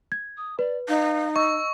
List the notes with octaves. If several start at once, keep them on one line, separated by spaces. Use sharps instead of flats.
G#6
D#6
B4 D5
D#4 F5
D#5 C#6 E6